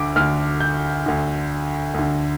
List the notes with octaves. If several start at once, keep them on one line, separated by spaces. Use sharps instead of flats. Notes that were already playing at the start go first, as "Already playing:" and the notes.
Already playing: D2 D3 D6
D2 D3 F6
G6
D2 D3
D2 D3